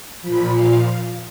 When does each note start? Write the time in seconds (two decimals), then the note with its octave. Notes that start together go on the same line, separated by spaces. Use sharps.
0.22 A#2 F3 B5
0.54 F5